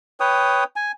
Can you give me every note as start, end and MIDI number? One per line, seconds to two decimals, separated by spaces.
0.20 0.64 71
0.20 0.64 73
0.20 0.64 79
0.20 0.64 87
0.76 0.92 80